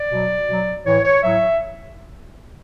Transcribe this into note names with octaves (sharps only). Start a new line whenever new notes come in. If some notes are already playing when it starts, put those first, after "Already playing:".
Already playing: D5
B2 F#3
B2 F#3
A2 E3 C#5
C#5
A2 F#3 E5